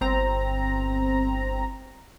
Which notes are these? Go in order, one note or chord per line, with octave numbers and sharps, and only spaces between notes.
G1 C4 A#5